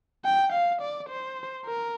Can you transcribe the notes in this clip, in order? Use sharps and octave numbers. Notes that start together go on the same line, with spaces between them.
G5
F5
D5
C5
A#4